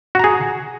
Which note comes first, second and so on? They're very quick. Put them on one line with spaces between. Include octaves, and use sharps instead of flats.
F#4 A#5 G#4